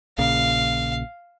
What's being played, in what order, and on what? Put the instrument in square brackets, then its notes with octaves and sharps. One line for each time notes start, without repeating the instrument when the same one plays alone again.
[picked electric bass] A#1 A#2 C#3 [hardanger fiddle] F5